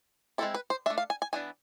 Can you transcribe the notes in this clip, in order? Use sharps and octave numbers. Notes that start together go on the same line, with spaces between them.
G#3 C4 E4 A4
B4
C5
A3 D4 E5
F5
G#5
G#5
E3 B3 D4 G#5